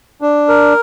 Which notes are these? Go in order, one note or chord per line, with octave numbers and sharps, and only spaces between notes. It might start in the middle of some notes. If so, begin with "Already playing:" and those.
D4
A#4